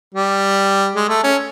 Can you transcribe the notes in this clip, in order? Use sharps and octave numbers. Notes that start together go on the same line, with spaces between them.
G3
G#3
A3
C#4